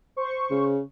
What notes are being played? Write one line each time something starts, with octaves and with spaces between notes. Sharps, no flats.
C5 C#6
C#3